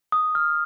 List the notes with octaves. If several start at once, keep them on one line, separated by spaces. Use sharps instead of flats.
D#6
F6